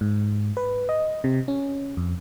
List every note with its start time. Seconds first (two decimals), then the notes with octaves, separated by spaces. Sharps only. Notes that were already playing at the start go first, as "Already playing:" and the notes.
0.01 G#2
0.57 B4
0.89 D#5
1.24 C3
1.48 C#4
1.97 F2